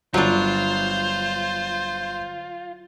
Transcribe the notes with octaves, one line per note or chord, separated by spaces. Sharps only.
G1 F#3 D4 F4 C5